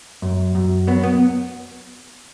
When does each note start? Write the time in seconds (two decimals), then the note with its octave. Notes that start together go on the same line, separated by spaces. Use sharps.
0.22 F#2
0.55 F#2
0.87 F#3 B3
1.03 B3